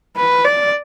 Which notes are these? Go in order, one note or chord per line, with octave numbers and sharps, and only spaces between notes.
B4
D5